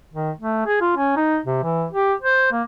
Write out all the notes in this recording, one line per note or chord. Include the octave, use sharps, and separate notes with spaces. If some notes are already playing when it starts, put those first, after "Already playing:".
D#3
A3
G#4
F4
C#4
D#4
C3
E3
G4
C5
A#3